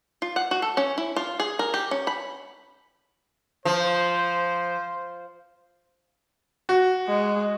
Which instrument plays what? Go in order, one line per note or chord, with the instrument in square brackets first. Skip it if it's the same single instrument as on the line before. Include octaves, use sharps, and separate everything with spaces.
[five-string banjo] F4
F#5
F#4
A4
C#4
E4
F4
G#4
A#4
G4
C#4
B5
[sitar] F3 [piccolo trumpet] C5
[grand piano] F#4
[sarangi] G#3